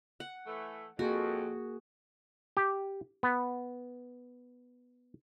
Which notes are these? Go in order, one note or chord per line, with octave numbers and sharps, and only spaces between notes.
F#5
E3 A3
F2 A#3 F#4 G#4
G4
B3